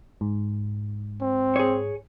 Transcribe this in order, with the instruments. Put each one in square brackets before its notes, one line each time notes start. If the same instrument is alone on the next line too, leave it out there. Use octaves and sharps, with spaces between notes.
[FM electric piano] G#2
[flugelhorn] C4
[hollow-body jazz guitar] G#4 C#5